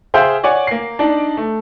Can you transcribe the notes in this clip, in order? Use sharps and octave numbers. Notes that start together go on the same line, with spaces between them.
G#4 C5 E5 F5 G5
C#5 D5 F#5 G#5
A#3 C7
D4 D#4 D5
A3